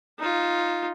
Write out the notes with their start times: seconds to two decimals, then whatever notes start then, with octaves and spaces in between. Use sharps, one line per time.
0.19 D#4 F4